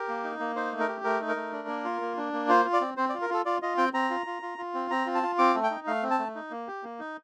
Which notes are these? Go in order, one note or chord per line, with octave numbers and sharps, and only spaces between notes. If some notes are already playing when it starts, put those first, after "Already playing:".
Already playing: G4 A#4
A#3
D#4
A#3
D#4 C5
A3
A#4
G4
A3 A#4
D#4
A#4
A3
D4
A#3
F4
A#3
D4
A#3
F4 C5
F4
D5
C4
C4 C5
D5
F4
A#4
F4 A4
F4 D5
F4 D#5
C4 G5
C4 A#5
F4
F4
F4
F4
C4
C4 A#5
F4
A5
F4
C4 D6
A3
G5
D#4
A3 F5
C4
A5
A3
D#4
A#3
G4
A#3
D#4